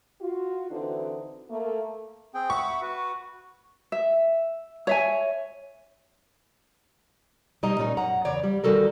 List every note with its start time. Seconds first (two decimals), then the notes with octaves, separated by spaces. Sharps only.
0.21 F4 F#4
0.70 D3 E3 C4 D#4 F#4
1.50 A3 A#3
2.34 C4 G#4 G5
2.50 E5 F#5 B5 C#6
2.82 F#4 B4
3.92 E5
4.87 C#5 E5 G#5
7.63 B2 G3 D#4 D#5 A#5
7.79 A#2 C#4 D#4
7.97 F#2 F#5 A#5
8.25 E2 C#3 C#5 D5
8.44 G3
8.64 D#3 G3 F#4 A4 A#4